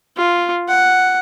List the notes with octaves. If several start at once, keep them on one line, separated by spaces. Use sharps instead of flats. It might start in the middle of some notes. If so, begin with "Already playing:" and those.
F4
F#5